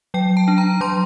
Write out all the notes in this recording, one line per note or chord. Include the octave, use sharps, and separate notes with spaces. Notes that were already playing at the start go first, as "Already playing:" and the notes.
F#3 G5
A5
D4
A#5
F#3 C6